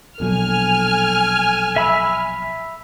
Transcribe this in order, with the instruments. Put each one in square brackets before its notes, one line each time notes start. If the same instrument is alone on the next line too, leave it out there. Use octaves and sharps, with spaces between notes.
[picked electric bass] A#1 B2 F#3 [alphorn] A4 [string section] G#5 F6
[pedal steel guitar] E5 B5 E6